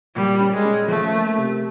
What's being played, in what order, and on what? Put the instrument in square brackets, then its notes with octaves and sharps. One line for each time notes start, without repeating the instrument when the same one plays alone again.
[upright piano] A#2 [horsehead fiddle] G3
[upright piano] C#4
[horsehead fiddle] G#3
[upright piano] C#4
[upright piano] F3 [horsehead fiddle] A3
[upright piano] A#3
C3